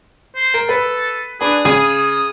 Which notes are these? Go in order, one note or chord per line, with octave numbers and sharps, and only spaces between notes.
C5
A#4
A4 B4
D4 G#4 B4
C#3 G#4 D#6